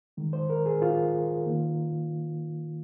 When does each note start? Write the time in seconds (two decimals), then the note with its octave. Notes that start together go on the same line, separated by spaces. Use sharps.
0.17 D#3 G#3
0.33 C5
0.50 A#4
0.66 G#4
0.82 F4
1.46 D#3 A#3